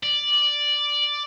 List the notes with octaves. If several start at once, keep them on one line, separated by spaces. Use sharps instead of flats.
D5